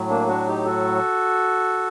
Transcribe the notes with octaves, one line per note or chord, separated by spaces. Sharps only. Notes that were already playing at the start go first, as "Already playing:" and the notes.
Already playing: A2 F#3
A#3 D4
D4 F#4
D#4 G4
F#4 A4